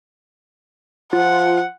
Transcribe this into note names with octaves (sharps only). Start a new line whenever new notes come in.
F3 F4 F#5